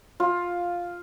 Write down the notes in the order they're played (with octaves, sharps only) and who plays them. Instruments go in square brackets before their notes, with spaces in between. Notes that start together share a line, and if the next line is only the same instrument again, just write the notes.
[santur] F4